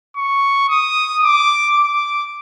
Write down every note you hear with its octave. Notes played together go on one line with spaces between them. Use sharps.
C#6
D#6
D6
D6